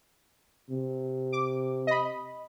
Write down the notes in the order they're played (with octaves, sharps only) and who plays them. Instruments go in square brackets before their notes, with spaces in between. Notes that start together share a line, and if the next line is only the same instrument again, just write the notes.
[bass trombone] C3
[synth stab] D6
D#5 B5